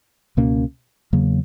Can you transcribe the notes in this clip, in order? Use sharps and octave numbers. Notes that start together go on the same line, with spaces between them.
C#2 B2 A#3 C#4
E2 C#3 F#3 A#3